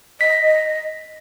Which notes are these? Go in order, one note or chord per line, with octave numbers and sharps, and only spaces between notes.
D#5 B6